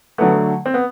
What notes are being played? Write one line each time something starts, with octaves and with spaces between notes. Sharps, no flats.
D3 F#3 A3 B3
C4
B3